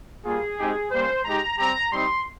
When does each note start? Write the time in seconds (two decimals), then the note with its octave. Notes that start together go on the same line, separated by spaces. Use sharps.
0.25 G3 A#3 F4 G#4
0.59 G#3 C4 D#4 G4
0.91 G3 A#3 C#4 C5
1.25 G#3 D#4 G4 A#5
1.58 G3 C4 G4 A#5
1.92 G3 C4 D#4 C6